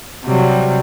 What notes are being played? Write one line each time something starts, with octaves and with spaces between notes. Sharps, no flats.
C3 F#3 G3